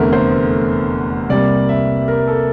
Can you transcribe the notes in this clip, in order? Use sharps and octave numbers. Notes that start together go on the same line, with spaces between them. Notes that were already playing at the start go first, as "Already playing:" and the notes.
Already playing: F1 E2 D3 A3 A#4
C5
C2 C3 G3 A#3 D5
E5
A#4
A4